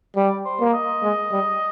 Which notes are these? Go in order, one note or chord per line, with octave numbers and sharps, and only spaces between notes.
G3 D5
C5
A#3
D#5
G#3
G3